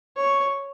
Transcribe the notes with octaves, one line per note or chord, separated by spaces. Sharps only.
C#5